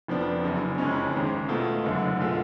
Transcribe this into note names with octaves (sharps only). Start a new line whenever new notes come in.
F1 F2 F3 B3 D4
F#1 F#2 C#3
F#1 F2 C#3 G#3 C#4
G#1 G#2 G#3
B2 A3 F4
F#1 F#2 D3 G#3
B2 A3 F4 G#4